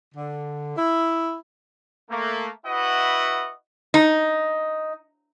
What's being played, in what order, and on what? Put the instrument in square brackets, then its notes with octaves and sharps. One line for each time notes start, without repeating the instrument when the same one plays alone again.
[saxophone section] D3
E4
[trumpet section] A3 A#3
E4 F#4 B4 D#5 E5 F#5
[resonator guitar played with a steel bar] D#4